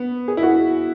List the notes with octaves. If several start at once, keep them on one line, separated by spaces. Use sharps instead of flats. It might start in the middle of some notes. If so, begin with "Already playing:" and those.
Already playing: B3
G#4
E4
F#4